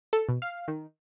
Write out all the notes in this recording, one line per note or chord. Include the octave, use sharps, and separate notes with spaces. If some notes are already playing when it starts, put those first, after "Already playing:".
A4
B2
F5
D#3